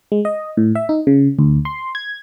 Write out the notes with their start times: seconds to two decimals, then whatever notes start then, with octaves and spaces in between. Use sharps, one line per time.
0.12 G#3
0.25 D#5
0.57 A2
0.75 E5
0.89 D#4
1.07 C#3
1.39 D2
1.65 C6
1.95 G#6